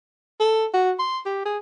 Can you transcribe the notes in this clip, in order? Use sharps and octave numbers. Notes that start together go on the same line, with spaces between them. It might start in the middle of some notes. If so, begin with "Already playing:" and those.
A4
F#4
C6
G4
G#4